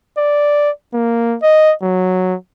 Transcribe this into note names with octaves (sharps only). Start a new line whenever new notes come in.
D5
A#3
D#5
F#3